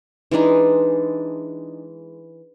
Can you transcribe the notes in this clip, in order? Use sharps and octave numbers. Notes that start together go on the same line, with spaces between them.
E3 G#3 D4 D#4